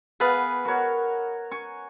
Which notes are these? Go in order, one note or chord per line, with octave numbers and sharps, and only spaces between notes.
B3 G#4 B4 F5
F#4 A#4 C#5
G#5 C#6